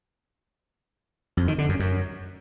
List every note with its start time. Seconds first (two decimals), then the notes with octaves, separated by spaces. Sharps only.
1.37 F2
1.48 D#3
1.58 D3
1.69 F#2
1.80 F#2